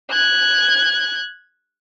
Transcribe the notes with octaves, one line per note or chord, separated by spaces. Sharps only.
F#6 G#6